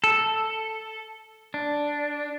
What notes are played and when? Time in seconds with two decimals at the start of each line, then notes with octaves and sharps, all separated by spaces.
0.04 A4
1.54 D4